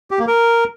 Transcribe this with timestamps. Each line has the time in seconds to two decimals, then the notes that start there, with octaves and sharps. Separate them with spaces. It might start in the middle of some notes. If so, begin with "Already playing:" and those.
0.11 G4
0.19 A#3
0.27 A#4